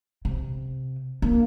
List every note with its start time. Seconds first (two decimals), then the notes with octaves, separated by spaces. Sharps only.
0.25 C3
1.22 A#3 D4